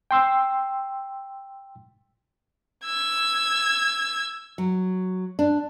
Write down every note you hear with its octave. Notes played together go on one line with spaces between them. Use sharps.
G5 C6 E6
E6 G#6
F#3
D4